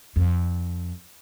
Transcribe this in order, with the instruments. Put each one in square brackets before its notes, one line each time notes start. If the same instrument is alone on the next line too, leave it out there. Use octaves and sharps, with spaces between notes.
[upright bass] F2